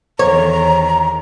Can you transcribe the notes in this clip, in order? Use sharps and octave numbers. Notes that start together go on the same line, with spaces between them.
E2 D#3 C#5 A#5